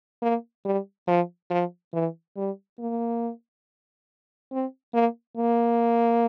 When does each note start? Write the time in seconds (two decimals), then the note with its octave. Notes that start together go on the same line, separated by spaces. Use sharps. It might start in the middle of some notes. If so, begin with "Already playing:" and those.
0.22 A#3
0.65 G3
1.07 F3
1.50 F3
1.93 E3
2.37 G3
2.79 A#3
4.52 C4
4.94 A#3
5.37 A#3